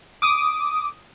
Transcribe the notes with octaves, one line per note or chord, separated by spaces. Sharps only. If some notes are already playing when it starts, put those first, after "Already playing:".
D6 D#6